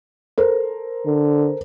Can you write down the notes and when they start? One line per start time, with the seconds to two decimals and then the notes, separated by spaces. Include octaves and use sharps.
0.38 A4 A#4 C5
1.06 D3